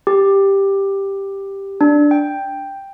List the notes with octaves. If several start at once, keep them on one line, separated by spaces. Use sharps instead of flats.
G4
D4
G5